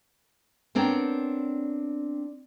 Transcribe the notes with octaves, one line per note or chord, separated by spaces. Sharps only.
B3 C4 D4 A#4 C#5 G5